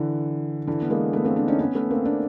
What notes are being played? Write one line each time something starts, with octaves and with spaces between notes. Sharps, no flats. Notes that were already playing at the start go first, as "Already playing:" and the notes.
Already playing: D3 E3
D3 E3
B3
G#3 A#3
A3 B3
A#3 C4
C4 D4
C#4 D#4
B3 C#4
A3 B3
A#3 C4
C4 D4